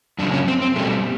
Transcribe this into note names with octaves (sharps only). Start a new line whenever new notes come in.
F#2 C#3 F3 D4
C#4
C4
C4
B2 G3 A3